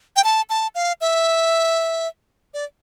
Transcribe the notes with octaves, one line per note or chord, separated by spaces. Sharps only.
G5
A5
A5
F5
E5
D5